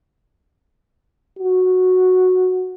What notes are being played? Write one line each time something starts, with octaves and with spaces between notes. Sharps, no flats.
F#4